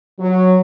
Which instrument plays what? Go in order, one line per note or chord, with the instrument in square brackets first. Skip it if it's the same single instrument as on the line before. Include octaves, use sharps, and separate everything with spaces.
[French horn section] F#3